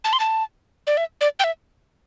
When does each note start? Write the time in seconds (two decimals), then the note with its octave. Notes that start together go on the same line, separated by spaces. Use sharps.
0.04 A5
0.13 C6
0.20 A5
0.87 D5
0.97 E5
1.21 D5
1.39 G5
1.44 E5